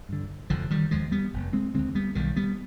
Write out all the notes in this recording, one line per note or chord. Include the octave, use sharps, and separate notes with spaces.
G2 D3
F1 D3 F3
D#3 G3
D#2 D3 F3 G#3
G3 B3
F1
G#3 C4
D#2 D3 G#3 C4
G3 B3
B1 D#3 G3
G3 B3